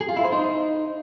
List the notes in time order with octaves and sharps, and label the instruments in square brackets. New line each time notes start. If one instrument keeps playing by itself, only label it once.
[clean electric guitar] G#4
F4
E4
C5
D#4